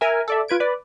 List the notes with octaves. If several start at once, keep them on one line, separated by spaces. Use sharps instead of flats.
A#4 E5 G#5
A4 D5 E5
F4 B4 G#6 D7
B4 D5